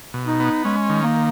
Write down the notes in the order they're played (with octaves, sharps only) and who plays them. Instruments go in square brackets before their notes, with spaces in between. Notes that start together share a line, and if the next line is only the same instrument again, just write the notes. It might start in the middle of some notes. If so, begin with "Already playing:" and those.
[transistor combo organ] B2
[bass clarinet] D#4
[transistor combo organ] B3
[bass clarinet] G#3 [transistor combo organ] C#4
[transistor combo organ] D#3
[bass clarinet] A#3